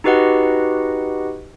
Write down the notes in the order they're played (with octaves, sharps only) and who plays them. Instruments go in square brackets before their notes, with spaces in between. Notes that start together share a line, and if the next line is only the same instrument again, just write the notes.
[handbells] D#4 F#4 G4 B4 D#5 F#5